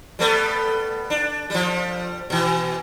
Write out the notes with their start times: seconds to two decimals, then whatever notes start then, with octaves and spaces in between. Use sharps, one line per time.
0.19 G3 A3 B3
1.10 D4
1.50 F3 G3
2.30 B2 E3